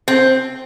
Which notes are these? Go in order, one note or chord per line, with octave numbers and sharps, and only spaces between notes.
C4